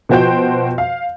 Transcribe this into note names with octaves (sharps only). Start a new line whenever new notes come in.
B2 F3 F#4 C5 G5 G6
F5